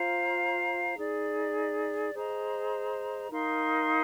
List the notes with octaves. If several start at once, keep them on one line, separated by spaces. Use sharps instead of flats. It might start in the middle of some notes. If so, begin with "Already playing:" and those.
Already playing: F4 C5 F5 A#5
D#4 G#4 D5
G#4 C5 D#5 A#5
D#4 A#4 F5 C6